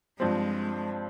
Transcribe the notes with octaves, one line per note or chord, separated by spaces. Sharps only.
G2 F3 G#3 C4